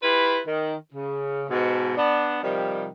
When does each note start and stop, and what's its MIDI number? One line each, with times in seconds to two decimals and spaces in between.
0.03 0.39 64
0.03 0.39 65
0.03 0.39 67
0.03 0.39 71
0.47 0.75 51
0.93 1.45 49
1.49 1.92 44
1.49 1.92 47
1.97 2.41 59
1.97 2.41 62
2.43 2.86 48
2.43 2.86 51
2.43 2.86 53
2.43 2.86 55